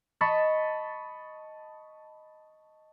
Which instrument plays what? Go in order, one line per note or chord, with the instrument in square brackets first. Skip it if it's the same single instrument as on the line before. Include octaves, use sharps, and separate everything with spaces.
[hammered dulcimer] D#5 A5 B5 C#6